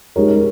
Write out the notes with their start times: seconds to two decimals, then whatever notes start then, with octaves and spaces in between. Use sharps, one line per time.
0.16 G#3 D#4 G4 A#4 C#5